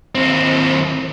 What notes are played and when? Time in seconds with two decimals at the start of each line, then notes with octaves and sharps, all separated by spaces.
0.15 D#2 C4